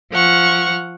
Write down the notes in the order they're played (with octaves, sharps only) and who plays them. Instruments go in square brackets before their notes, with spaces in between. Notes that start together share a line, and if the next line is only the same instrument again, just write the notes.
[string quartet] F3 F#5 C#6 F6